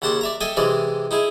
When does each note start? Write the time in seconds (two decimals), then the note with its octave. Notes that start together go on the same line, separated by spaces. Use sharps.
0.02 D#2 C#3 F#5 A5 C6 D6
0.21 D5 E5 A#5
0.41 A4 D#5 E5 G5 G#5
0.57 C3 E3 G#3 D5 D#5
1.11 D#4 E4 G#4